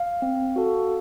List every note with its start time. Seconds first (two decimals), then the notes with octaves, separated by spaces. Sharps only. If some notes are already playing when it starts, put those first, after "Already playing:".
Already playing: F5
0.22 C4
0.56 F#4 A4